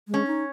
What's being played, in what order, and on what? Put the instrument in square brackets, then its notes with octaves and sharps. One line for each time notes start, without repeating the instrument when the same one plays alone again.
[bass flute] G#3
[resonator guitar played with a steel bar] C#4
[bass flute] D#4